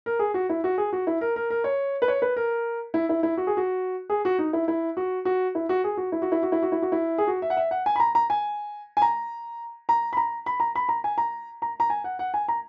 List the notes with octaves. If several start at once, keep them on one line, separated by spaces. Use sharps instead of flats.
A#4
G#4
F#4
E4
F#4
G#4
F#4
E4
A#4
A#4
A#4
C#5
B4
C#5
B4
A#4
E4
E4
E4
F#4
G#4
F#4
G#4
F#4
D#4
E4
E4
F#4
F#4
E4
F#4
G#4
F#4
E4
F#4
E4
F#4
E4
F#4
E4
F#4
E4
G#4
F#4
E5
F#5
E5
F#5
G#5
B5
A#5
A#5
G#5
G#5
A#5
A#5
B5
A#5
B5
A#5
B5
A#5
G#5
A#5
A#5
A#5
G#5
F#5
F#5
G#5
A#5